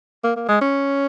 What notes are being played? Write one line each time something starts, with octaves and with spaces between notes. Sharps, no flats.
A#3
A#3
G#3
C#4